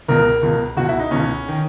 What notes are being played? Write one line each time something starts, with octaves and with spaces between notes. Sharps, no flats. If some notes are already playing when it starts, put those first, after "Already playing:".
C#2 B2 A#4
C#2 B2
C#2 B2 F#4
E4
D#4
C#2 B2 C#4
D#3